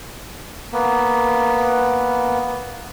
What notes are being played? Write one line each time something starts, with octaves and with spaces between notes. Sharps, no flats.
A#3 B3